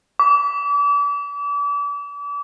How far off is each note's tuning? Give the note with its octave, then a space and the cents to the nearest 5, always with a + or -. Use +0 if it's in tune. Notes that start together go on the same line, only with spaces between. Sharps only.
D6 -35